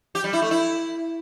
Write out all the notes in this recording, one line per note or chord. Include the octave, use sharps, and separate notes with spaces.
G4
G3
E4
A3
E4